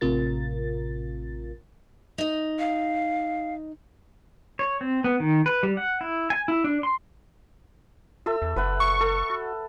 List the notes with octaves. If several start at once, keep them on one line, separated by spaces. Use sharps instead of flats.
A1 A2 C3 F4 A#4 A6
D#4 D#5
F5
C#5
C4
B3
D#3
B4
G3
F#5
E4
G#5
E4
D4
C6
F4 A4 E5 E6
E2
F#1 B4 E5 F#5
C#6
A4
F#4